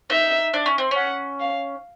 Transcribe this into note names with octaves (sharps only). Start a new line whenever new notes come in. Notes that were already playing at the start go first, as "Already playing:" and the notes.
D#4 E5
D4
C#4
C4
C#4
F#5
F5